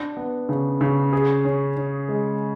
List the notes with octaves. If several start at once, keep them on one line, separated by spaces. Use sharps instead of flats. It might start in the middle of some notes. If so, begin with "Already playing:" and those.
Already playing: D4
B3
C#3
C#3
G#4
C#4
C#4
G#3